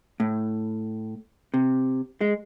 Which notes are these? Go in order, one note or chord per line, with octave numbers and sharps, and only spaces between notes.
A2
C3
G#3